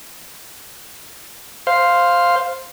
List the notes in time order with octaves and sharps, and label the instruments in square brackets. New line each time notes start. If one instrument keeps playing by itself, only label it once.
[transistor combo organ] C5 F5